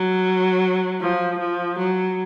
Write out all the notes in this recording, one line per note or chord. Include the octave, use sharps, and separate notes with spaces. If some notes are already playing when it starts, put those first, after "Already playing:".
Already playing: F#3
F3
F3
F#3